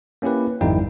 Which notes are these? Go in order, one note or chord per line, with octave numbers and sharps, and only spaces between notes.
A#3 C#4 E4 G4 B4
G#1 F2 G3 D#4 E4 G5